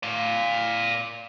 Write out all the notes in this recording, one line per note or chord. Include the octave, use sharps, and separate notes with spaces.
D5 F5